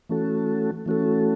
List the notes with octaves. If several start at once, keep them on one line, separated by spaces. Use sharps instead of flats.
E3 A3 C#4 F#4 A4
E3 A3 C#4 F#4 A4